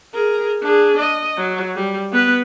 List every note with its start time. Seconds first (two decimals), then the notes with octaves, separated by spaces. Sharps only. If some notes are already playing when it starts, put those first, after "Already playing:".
0.15 G#4 A#4
0.63 D4 G#4
0.98 D#5
1.38 F#3
1.76 G3
2.12 B3 B4